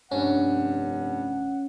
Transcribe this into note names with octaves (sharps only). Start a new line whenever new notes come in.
F1 G2 C#4 F#5